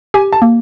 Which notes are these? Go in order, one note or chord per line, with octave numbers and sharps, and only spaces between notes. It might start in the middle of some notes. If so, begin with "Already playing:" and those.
G4 G#5
A5
A#3